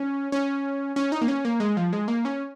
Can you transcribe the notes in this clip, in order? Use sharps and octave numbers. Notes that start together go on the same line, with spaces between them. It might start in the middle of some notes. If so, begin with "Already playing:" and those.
Already playing: C#4
C#4
C#4
D#4
A#3
C#4
A#3
G#3
F3
G#3
A#3
C#4